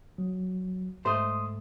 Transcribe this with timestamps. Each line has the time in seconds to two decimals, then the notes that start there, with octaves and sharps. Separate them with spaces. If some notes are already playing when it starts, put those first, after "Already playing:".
0.18 F#3
1.05 G#2 A3 C5 C6 D#6